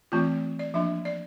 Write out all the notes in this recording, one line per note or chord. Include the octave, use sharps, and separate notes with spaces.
E3 A3 C4 F4
D5
F3 A#3 D4 E5
D5